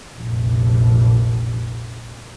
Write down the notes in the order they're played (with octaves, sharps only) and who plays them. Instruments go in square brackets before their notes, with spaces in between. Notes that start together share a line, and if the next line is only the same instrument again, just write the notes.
[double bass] F1 A#1